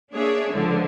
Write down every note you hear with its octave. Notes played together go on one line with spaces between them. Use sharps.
A#3 D4 G#4 C#5 E5
C#2 D3 F3